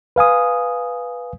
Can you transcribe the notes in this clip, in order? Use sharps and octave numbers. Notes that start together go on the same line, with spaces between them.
B4 F5 G#5 D#6